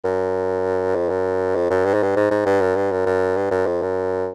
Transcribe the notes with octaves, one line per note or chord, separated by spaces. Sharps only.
F#2
F2
F#2
F2
F#2
G2
G#2
G2
G#2
G#2
G2
F#2
G2
F#2
F#2
G2
F#2
F2
F#2